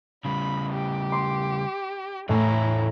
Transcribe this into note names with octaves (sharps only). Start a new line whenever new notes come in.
C#3 G3 B5
G4
C6 D6
E2 A2 A3 E4 G#5 A#5